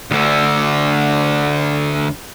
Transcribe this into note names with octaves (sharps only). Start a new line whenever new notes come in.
D2 D3